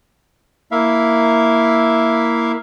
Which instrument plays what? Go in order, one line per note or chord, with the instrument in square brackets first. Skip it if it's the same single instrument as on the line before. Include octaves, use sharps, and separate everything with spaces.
[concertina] A#3 E4 E5 F5